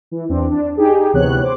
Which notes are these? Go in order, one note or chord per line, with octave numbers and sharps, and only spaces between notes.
E3
E2 C4 D4
D4
D#4 G4 G#4
D2 C3 E3 B3 C#5 F#6
C5 D6